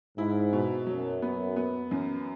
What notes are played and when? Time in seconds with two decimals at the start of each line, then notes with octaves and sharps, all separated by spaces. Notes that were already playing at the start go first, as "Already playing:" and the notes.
0.18 G#2 E4
0.53 B2
0.87 F#2 F#3
1.22 B3
1.56 B3
1.91 F#2